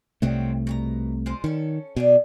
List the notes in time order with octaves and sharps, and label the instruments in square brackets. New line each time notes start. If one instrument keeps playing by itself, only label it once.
[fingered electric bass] C2 C3 A3 [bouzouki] D#3 F#3 C4
[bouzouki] B2 G4 A#5
G#3 F4 C5
[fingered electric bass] D#3 [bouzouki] C#4 A4
[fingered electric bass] B2 [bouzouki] G#4 D5 E5